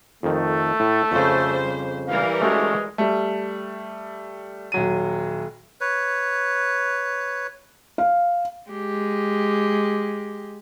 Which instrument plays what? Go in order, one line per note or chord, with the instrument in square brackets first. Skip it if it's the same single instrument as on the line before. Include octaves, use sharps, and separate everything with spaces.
[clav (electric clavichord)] F2 D#3 [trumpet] A3
[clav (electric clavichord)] A2
[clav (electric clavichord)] F2 C#3 [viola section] G3 C5
[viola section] E3 G3 A#4 [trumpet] F5
[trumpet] G#3 [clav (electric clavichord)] A3 C#4 F#4
[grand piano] G3 A3
D#1 F#3 D#7
[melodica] B4 C#5
[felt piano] F5
[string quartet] G#3 G4